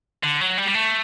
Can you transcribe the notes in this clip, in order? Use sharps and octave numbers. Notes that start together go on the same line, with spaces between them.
D3
F#3
G3
G3
A3